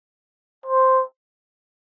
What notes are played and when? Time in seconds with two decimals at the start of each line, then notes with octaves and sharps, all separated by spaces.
0.66 C5